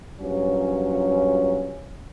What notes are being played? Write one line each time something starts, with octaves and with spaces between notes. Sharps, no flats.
G2 A#2 F3 F#3 C#4